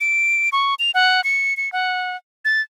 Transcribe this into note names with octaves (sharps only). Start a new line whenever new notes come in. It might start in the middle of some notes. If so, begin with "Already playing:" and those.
D7
C#6
F7
F#5
C#7
C#7
F#5
A6